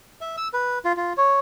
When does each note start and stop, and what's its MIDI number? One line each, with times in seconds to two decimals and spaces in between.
0.21 0.36 76
0.37 0.48 88
0.54 0.79 71
0.85 0.92 65
0.97 1.13 65
1.17 1.40 73